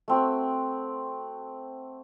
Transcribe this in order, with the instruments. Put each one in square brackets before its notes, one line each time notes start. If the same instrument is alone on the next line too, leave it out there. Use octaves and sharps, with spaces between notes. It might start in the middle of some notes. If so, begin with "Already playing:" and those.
[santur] A3 C4 F#4